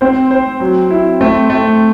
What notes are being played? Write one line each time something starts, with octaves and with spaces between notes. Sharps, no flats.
C4 C5
C5
F#3
E4
A3 C4
A3